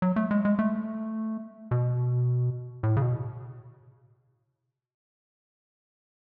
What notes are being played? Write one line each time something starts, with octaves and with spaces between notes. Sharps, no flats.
F#3
A3
G#3
G#3
A3
B2
A2
C#3
B2